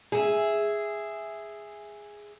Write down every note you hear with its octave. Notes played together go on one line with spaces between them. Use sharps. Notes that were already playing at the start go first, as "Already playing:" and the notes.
G#4 E5